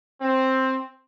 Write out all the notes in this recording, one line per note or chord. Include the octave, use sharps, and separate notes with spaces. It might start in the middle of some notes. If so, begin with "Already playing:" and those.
C4